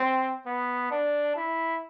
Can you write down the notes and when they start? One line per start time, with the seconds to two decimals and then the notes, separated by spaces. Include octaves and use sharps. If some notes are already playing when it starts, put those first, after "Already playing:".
Already playing: C4
0.46 B3
0.91 D4
1.36 E4